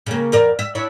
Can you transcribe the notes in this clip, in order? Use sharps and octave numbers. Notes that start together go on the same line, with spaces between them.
C#3 A#3
E2 A#4 D5
E5
D4 E4 C#5